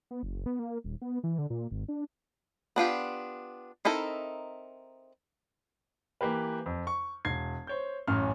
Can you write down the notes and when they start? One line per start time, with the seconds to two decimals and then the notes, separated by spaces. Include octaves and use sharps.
0.11 B3
0.23 F#1
0.46 B3
0.59 A#3
0.84 D#1
1.02 B3
1.24 E3
1.38 D3
1.50 A#2
1.71 G#1
1.88 D4
2.76 B3 D4 F4 G4
3.85 C4 D#4 E4 A4 A#4
6.21 E3 A#3 G4 B4
6.66 F2
6.87 C#6
7.25 E1 G#6 C7
7.67 C5 C#5 G6
8.08 A1 F#2 C#4 F6